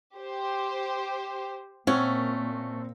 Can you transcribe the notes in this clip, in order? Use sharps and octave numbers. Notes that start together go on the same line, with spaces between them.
G4 C5
A#2 A3 C4 C#4 F#5